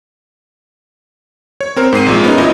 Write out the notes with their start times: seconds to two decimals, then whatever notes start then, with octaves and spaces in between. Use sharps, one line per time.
1.61 C#5
1.76 C4 A#4 C5
1.92 G#2 C4 C7 D#7
2.06 A#1 A#2 G#3
2.24 B3 C#4 D#4
2.38 A1 A#2 E4 D#5